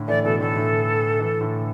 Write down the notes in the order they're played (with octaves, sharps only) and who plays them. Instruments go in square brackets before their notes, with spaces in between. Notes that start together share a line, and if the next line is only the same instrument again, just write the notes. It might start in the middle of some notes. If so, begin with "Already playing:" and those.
Already playing: [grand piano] A2 D3
[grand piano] E3 A3 [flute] D5
[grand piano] B2 E3 [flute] A4
[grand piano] A2 D3 [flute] A4
[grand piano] A2 D3
E3 A3
A2 D3